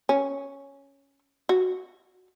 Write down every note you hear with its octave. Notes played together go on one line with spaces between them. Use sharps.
C#4
F#4